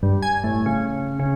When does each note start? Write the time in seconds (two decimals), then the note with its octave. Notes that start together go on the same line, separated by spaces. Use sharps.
0.03 G2
0.22 G#5
0.44 A2
0.66 C#3
1.20 C#3